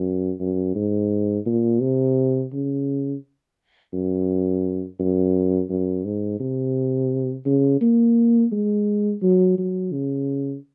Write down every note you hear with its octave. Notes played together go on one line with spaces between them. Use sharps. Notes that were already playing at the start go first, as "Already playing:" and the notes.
Already playing: F#2
F#2
G#2
A#2
C3
C#3
F#2
F#2
F#2
G#2
C3
C#3
A#3
G#3
F#3
F#3
C#3